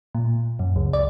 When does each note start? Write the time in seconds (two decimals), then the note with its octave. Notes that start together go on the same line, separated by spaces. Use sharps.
0.15 A#2
0.59 F#2
0.76 C#2
0.93 D5